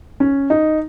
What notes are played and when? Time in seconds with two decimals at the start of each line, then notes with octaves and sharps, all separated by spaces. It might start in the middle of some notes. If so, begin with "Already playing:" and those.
0.20 C#4
0.50 D#4